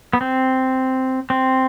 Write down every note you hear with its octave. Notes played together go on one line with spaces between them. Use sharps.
B3
C4
C4